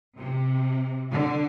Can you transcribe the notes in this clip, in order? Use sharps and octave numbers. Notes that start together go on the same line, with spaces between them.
C3
D3